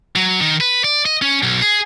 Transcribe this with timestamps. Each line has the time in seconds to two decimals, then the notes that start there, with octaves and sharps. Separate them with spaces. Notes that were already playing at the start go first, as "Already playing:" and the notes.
0.16 F#3
0.41 D#3
0.61 B4
0.84 D5
1.06 D#5
1.22 C#4
1.43 B1
1.62 G#4